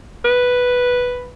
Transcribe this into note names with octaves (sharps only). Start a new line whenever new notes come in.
B4